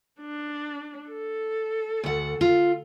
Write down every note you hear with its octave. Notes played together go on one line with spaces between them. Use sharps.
D4
A4
D2 F#5
F4